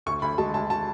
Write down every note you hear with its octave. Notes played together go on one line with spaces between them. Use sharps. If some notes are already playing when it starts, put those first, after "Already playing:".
D2 C#6
D2 B5
G#3 A5
D2 A5
A5